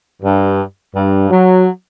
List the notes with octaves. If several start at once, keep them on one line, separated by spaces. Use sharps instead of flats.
G2
G2
F#3